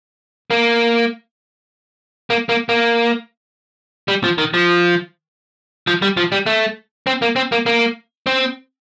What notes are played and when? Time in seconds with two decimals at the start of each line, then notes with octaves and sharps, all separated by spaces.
0.50 A#3
2.30 A#3
2.49 A#3
2.69 A#3
4.08 G3
4.24 F3
4.38 D#3
4.54 F3
5.87 F3
6.02 G3
6.17 F3
6.32 G3
6.46 A3
7.07 C4
7.22 A#3
7.36 C4
7.52 A#3
7.66 A#3
8.27 C4